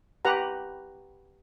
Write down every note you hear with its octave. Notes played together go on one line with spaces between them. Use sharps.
G4 B4 F#5 A#5